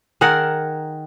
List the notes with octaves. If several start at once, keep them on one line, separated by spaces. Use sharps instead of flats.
D#3 G#4 A#4 F#5